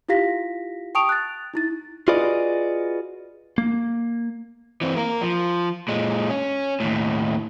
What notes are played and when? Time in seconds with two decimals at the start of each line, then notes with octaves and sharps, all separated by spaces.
0.09 E4 F4 G4 F5 A#6 B6
0.95 G5 A5 C#6 D#6 D7 F7
1.09 F#6 A6
1.54 D#4 E4 A6
2.08 F4 F#4 G#4 B4 D5 D#5
3.58 A#3
4.81 E3 C4
4.96 A#3 A#4
5.21 F3
5.88 A#2 G#3
6.30 C#4
6.80 D#2 A2